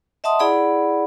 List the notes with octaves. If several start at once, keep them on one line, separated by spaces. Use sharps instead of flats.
D#5 E5 F#5 A5 C6 D#6
E4 G#4 D5 F#5 B5